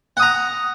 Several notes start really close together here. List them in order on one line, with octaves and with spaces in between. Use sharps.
F#5 D#6 A#5